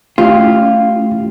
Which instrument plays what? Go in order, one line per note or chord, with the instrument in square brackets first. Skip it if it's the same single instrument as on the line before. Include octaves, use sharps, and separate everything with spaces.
[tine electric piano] A3 [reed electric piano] C#4 E4 G4 [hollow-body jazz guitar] F4